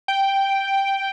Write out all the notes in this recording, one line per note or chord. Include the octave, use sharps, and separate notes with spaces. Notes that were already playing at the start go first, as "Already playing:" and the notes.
G5